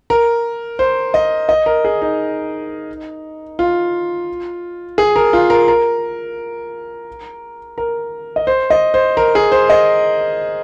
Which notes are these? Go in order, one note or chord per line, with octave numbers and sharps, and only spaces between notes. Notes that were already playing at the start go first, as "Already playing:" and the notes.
A#4
C5
D#5
D#5
A#4
G#4
D#4
F4
G#4
A#4
F4
A#4
A#4
A#4
D#5
C5
D#5
C5
A#4
G#4
C5
D#5